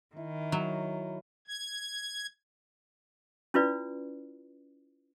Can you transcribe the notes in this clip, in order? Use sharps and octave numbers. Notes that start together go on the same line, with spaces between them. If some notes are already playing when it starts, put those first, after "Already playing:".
D#3 E4
F#3
G#6
C#4 E4 F4 B4 D5